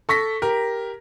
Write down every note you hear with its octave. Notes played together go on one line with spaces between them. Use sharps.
A4 C#6 A#6 B6
G4 A#4